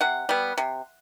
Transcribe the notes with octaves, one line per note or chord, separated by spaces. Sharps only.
C3 F#5
G3 B3
C3